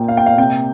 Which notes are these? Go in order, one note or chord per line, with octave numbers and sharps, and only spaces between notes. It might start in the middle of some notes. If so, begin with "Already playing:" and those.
Already playing: A#2 A#3 G5
F5
G5
F5
C3 G5